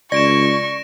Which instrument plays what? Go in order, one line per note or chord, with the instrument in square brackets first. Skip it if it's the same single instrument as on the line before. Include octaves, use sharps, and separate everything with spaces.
[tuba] C#2 [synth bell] D5 [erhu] C#6 [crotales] A#6 D7 E7